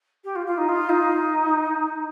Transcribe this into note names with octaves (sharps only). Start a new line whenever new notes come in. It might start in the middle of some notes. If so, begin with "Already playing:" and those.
G4
F4
F4
D#4
F4
D#4